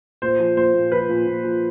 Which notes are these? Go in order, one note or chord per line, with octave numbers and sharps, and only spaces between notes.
A#2 C5
F3
A#2 C5
A#2
F3 B4
A#2
A#2
F3